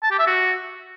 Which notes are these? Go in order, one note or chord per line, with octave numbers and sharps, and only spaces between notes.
A5
G4
E5
F#4